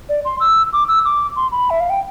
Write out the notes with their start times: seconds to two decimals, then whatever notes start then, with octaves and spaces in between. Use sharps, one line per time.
0.09 D5
0.25 C6
0.40 E6
0.73 D6
0.88 E6
1.05 D6
1.36 C6
1.52 B5
1.70 E5
1.80 F5
1.90 G5